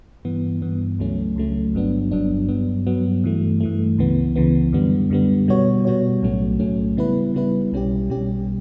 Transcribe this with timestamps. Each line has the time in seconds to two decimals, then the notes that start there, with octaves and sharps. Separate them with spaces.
0.25 G2 E3 B3
0.62 G2 E3 B3
0.99 C#2 C#3 F#3 A3 C#4
1.36 C#2 C#3 F#3 A3 C#4
1.75 G1 G2 F#3 B3 D4
2.11 G1 G2 F#3 B3 D4
2.49 G2 F#3 B3
2.87 G2 F#3 B3
3.24 G2 E3 A3
3.61 G2 E3 A3
3.98 C#2 C#3 E3 B3
4.36 C#2 C#3 E3 B3
4.73 F#2 D3 G3 B3
5.10 F#2 D3 G3 B3
5.48 B2 G3 B3 F#4 C#5
5.85 B2 G3 B3 F#4 C#5
6.23 B1 A2 F#3 A3 C#4
6.60 B1 A2 F#3 A3 C#4
6.97 C#3 G3 B3 E4 B4
7.34 C#3 G3 B3 E4 B4
7.72 B1 B2 G3 C#4 G4
8.10 B1 B2 G3 C#4 G4